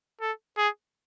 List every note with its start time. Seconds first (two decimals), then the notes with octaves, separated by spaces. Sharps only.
0.21 A4
0.57 G#4